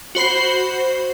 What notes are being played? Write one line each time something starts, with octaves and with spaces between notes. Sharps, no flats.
F#4 C5 B5 C7